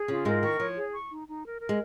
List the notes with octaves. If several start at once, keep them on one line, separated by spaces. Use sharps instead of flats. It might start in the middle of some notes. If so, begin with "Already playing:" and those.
Already playing: G#4
C#3 C#4 F4
G#2 G#3 A#4
D#3 C#6
F3 C#5
G#4
C#6
D#4
D#4
A#4
A#4
G#3